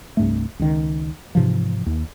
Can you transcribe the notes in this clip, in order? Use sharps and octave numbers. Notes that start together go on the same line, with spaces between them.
C2 G2 A3
C#2 D#3
G#2 C3 E3 F3
D#2